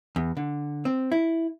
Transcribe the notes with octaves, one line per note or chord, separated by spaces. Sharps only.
E2
D3
C4
E4